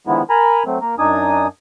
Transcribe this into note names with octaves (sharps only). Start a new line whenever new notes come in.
D3 D#3 F3 G#3 B3 E4
A#4 G#5 A#5 B5
F#3 A3 C4
A#3 A#4
F#2 D4 D#4 G#5 D#6